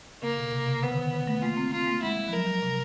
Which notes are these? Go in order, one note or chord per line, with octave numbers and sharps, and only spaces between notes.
C#3 A#3
B2
C3
C#3
D3 B3
D#3
D3
D#3
A3
A#3 F4
C4
C4 F4
A#3
G#3 E4
G3
F3
F#3 A#4
F#3
C3